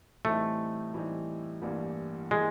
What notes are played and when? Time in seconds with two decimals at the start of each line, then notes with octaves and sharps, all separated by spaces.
0.25 A2 E3 G3 A3 C4 D#4
0.94 A2 E3 G3 C4 D#4
1.62 A1 G2 E3 G3 A#3
2.31 E3 G3 G#3 A#3